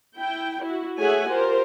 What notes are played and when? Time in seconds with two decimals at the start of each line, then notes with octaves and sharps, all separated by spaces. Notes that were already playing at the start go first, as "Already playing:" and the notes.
0.18 E4 G5
0.62 E4 F#4
0.98 A3 G#4 C#5 E5 F#5 G#5
1.28 F4 G4 A#4 C5